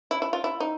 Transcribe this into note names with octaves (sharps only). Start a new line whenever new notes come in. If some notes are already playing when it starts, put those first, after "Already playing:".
E4
E4
F4
E4
D#4